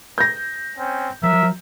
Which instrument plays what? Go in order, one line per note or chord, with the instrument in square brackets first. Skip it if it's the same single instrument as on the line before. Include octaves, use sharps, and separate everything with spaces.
[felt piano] G6 A#6
[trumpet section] C4 C#4
[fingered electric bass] F3 F#3 [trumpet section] A#4 E5